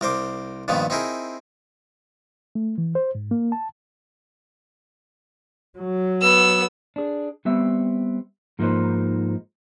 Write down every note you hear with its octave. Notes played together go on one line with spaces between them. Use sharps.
C2 A#4 C5 D6
G2 A#2 D#3 F3 B3
C4 D#4 E4 G#4 A#4
A3
E3
C5
G#2
A#3
A5
F#3
B3 E6
D4 G#4
G3 B3 C4 E5
G#2 F3 A#3 D#4 B4 C5